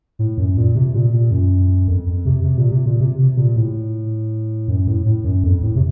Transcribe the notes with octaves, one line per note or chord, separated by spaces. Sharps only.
A2
F#2
A#2
C3
A#2
A#2
F#2
F2
F2
C3
C3
A#2
C3
A#2
C3
C3
A#2
A2
F#2
A2
A2
F#2
F2
A2
C3